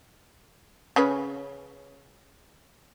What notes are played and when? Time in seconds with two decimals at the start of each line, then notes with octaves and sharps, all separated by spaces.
0.96 C#3 C#4 B4